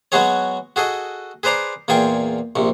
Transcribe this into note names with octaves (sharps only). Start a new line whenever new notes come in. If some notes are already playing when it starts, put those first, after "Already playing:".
F#3 G#3 B3 F#4 G#4 C#5
F#4 G#4 A4 D#5
G#4 B4 C5 D5 A#5 C6
E2 A#2 F4 G#4 G5 C#6
A#1 C3